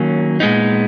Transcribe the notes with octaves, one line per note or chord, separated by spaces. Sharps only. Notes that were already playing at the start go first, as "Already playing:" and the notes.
Already playing: D#3 F#3 A#3 C#4
A#2 G#3 B3 D#4